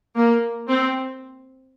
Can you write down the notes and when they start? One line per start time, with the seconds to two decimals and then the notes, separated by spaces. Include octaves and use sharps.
0.16 A#3
0.68 C4